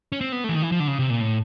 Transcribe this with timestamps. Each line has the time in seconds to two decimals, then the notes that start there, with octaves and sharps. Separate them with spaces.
0.12 C#4
0.21 C4
0.32 B3
0.44 A3
0.49 E3
0.55 D#3
0.62 E3
0.72 F3
0.80 D3
0.88 C#3
0.99 C3
1.10 A#2
1.21 A2